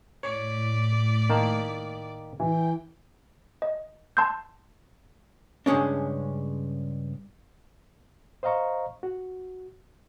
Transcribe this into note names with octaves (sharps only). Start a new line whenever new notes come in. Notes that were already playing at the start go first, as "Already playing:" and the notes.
A2 C#5 D5 B6
D#3 A#3 A5
E3 E4 G5
D#5
A5 C6 E6 G6
G2 C#3 G#3 C#4 D4
C5 D#5 F5 A#5 C#6
F#4